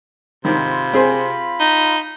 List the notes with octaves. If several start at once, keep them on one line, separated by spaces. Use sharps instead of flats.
G#2 C3 D#3 F4 B5
C4 G#4 C5
D#4